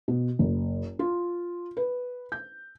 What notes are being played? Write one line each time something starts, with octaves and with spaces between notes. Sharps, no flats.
B2
F#1
F4
B4
G6